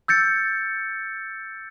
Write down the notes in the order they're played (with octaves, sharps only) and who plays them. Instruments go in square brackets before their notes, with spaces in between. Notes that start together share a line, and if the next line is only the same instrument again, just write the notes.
[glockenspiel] E6 G6 A6 C#7